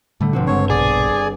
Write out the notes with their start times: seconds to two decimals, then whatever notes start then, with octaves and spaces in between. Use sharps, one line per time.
0.21 A2 D3 G3 A3
0.33 G1 B2 F3 C4 F#4
0.47 G2 G#3 C4 C#5
0.70 A#1 B2 G#4 D5